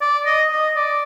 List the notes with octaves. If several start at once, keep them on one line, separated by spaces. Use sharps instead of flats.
D5
D#5
D#5
D5